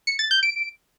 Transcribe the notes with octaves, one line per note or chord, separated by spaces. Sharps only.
C#7
A6
G6
D7